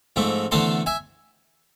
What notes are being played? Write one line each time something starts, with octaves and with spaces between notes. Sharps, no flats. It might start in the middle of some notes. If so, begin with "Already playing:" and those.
G#2 F3 A3 C4
E2 D3 A3 C4 A5 C6
E5 G#5